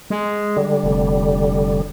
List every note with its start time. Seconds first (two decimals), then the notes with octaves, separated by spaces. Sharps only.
0.10 G#3
0.57 D3 G3
0.83 F1